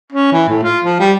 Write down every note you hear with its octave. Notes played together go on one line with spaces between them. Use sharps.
C#4
E3
A2
F4
F3
G3